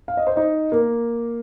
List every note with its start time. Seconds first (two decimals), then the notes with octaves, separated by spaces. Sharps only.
0.08 F5
0.17 D#5
0.27 C5
0.36 D#4 D#5
0.72 A#3 A#4